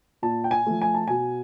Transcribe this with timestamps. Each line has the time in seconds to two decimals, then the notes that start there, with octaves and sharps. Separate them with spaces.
0.22 A#2 A5
0.44 G5
0.51 G#5
0.67 F3 A3
0.82 G#5
0.95 A5
1.08 B2 G#5